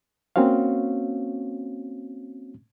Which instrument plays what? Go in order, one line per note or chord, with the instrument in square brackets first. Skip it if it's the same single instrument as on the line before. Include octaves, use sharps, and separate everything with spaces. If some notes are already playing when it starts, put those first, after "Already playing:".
[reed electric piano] A#3 C4 C#4 F#4 C#5 F5